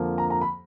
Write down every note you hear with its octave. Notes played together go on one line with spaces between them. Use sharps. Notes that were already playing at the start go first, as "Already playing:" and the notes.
Already playing: F2 D3 F3 A#3
A#5
A#5
B5